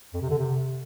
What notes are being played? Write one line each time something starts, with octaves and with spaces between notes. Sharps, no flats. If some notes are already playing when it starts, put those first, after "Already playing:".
F2
C3
D3
C3